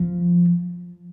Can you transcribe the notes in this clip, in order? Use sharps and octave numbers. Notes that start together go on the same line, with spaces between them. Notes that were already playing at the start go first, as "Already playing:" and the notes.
Already playing: F3